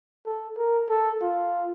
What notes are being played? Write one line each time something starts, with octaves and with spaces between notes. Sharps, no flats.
A4
A#4
A4
F4